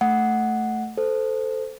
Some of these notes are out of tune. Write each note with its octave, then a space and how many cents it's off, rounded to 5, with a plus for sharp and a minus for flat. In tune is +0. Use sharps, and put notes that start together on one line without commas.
A3 +0 F#5 +0
A4 +0 C5 -15